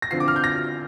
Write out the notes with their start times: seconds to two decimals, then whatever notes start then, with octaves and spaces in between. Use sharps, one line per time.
0.02 A#6
0.11 D3 F3 C4 F4 C7
0.20 D6
0.28 F6
0.36 G6
0.44 A#6